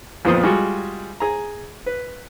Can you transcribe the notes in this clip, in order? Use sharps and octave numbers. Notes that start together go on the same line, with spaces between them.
F2 A#2 F3 B3 C5 D#6
G3 G#3 F4 F#4
G#4 A#5
B4